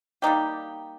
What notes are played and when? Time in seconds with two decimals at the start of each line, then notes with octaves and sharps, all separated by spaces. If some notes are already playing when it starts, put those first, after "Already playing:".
0.22 G3 A#3 D#4 G4